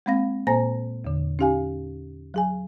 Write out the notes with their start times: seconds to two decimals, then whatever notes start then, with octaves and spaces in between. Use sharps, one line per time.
0.06 G#3 A#3 C4 F5 A#6
0.47 A#2 A#3 C5 G#5 A#5 A#6
1.04 E2 D3
1.39 C#4 D#4 G4 F5 G#5
2.34 F#3 G#4 G#5